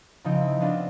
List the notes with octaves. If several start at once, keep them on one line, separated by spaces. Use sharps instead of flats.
C#3 F3 C4 D#4
E4
B3 C4 D4 F4